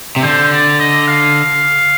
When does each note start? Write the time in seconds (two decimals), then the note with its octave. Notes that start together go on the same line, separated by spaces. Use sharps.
0.16 C3
0.22 D3 C5
0.51 D5
0.79 D#5
1.08 F5